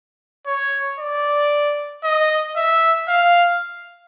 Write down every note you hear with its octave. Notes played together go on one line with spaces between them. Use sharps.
C#5
D5
D#5
E5
F5